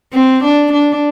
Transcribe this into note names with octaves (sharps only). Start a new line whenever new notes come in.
C4
D4
D4